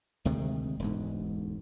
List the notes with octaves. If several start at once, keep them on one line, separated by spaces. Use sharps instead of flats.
D2 C3 D#3 G#3
E1 D2 G#2